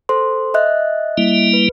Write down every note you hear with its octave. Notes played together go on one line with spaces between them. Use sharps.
A4 C5 C6
D#5 E5 F#6
G3 A#3 E4
B4